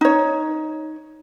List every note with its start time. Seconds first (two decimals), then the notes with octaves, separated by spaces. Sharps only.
0.01 D#4 C#5